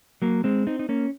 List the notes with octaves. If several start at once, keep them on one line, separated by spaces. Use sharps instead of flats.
F#3 A#3
G#3 C4
C4 D#4
D#4
A#3 C#4